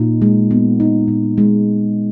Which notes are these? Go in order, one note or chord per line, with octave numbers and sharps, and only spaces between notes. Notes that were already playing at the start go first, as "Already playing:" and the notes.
Already playing: A#2 D#4
G#3
B3
D#4
A#2
G#3